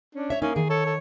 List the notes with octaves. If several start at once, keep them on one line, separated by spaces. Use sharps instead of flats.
C#4 D4
C#5 E5
A#3 C#4 D#4
D#3 G#4
A4 C#5
A4